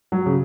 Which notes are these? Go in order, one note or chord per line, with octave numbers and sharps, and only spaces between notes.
F#3
C#3